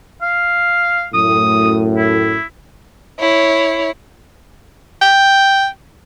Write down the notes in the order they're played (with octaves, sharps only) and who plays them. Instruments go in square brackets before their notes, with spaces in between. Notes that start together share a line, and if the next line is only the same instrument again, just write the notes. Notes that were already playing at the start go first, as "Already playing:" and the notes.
[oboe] F5
[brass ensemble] F#2 A2 [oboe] D#6
[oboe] E4
[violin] E4 C#5
[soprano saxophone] G5